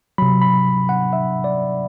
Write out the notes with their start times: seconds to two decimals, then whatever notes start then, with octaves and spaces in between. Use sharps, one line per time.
0.18 C3 F#3 B5
0.42 B5
0.89 F#5
1.13 E5
1.44 D5